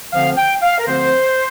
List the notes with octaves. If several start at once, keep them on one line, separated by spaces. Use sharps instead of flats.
D2 D3 F3 C4 F5
G5
F5
A#4
D2 D3 F3 C4 C5